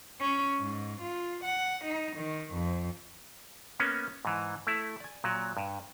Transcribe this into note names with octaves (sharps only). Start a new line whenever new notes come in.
C#4
G#2
F4
F#5
D#4
D#3
F2
A#3 B3 C#4
G#2 E3
A3 E4
D5 G#5
A#2 F#3
G2